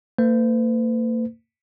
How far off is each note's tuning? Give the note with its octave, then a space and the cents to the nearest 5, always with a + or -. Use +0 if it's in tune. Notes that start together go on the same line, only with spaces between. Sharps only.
A#3 -40 B4 +45